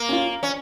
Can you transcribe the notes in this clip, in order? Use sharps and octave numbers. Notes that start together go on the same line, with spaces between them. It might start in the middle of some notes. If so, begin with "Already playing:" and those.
Already playing: A#3
C#4 F4
C#4